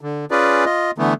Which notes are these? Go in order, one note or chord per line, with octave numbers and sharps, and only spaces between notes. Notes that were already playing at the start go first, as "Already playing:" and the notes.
D3
C#4 F4 G#4 B4 D5
F4 D#5
D3 E3 A3 B3